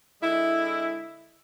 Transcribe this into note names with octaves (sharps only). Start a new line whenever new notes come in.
D3 G#3 E4